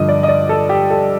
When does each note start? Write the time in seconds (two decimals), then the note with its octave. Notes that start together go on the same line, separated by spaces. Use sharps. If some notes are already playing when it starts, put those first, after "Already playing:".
Already playing: G2 D3 F3 D#5
0.09 D5
0.23 D#5
0.29 D5
0.49 A4
0.69 G4
0.90 A4